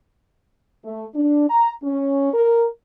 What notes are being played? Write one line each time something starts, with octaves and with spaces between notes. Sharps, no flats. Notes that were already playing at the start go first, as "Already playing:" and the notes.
A3
D4
A#5
C#4
A#4